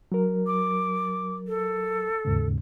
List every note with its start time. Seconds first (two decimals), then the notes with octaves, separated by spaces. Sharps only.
0.12 F#3 A#4
0.47 D6
1.48 A4
2.25 D#2 G#2 C#3